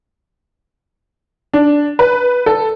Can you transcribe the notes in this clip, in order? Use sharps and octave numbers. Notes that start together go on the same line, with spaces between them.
D4
B4
A4